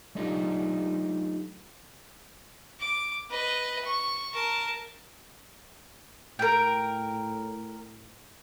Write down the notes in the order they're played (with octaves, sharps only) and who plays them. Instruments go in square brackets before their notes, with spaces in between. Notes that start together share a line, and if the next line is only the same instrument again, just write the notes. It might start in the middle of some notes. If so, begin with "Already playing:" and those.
[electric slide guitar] F#3 A3 D4 D#4 F4 G4
[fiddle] D6
B4 D#5
C#6
A#4 A5
[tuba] A2 [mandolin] A#4 G5